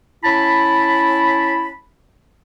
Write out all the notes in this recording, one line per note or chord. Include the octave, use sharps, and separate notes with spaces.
C#4 E4 A5 B5